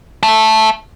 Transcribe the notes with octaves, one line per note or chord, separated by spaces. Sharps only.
E5 A5